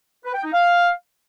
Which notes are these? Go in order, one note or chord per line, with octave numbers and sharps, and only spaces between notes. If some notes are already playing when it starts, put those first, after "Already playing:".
B4
G5
D#4
F5